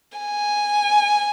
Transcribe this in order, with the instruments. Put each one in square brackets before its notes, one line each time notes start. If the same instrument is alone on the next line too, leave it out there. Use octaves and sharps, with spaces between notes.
[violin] G#5